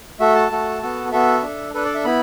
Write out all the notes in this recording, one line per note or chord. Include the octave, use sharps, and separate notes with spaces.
A3 F#4 A4 E5
A5
A3 F#4 A4
B3 F#4 A4
B3 F#4 A4 E5
D4 A4
D4 A4 B4
D5
E5
B3 E4 B5